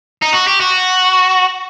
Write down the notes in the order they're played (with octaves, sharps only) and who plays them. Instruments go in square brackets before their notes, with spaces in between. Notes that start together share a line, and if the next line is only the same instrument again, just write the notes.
[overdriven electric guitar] D#4
F#4
G4
F#4